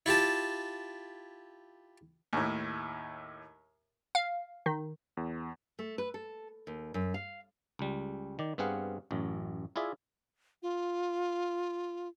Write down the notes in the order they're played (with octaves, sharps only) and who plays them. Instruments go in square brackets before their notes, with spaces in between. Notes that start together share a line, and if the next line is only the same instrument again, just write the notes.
[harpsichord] E4 F4 G4 A5
[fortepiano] D#2 A2
[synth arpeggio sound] F5
D#3
[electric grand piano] E2
[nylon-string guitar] A3
B4
A4
D#2
F#2
F5
[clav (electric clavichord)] C#2 G3
D#3 D5
G2 B3 C4 G#4 F5 F#5
A1 F#2
E4 F4 G#4 D5 E5
[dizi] F4